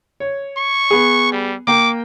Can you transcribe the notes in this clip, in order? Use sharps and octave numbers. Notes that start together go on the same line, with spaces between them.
C#5
C#6
B3 G#4
G3
A#3 G5 D6